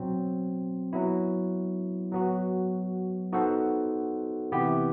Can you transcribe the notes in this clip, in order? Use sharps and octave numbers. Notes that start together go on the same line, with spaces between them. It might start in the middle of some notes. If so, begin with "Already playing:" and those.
Already playing: B2 F#3 C4
F#3 B3 E4
F#3 B3 F#4
B3 D#4 F#4 A4 C5
C3 E3 B3 E4 G4